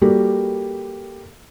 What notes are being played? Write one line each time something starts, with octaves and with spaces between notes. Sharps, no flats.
G3 A#3 F#4 G4 A4 A#4